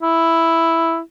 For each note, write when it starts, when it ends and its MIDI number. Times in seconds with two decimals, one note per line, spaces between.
0.03 1.00 64